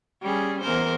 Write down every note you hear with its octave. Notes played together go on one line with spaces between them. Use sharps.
G3 C#4 G#4
E2 A#4 C5